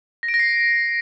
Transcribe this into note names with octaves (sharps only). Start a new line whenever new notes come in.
A#6
D7
A#6
C7